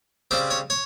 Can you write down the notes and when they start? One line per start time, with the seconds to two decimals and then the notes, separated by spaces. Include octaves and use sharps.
0.31 C#3 G3 C4 C5
0.50 C#5
0.70 C#5